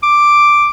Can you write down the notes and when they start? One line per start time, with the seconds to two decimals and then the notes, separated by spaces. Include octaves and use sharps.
0.03 D6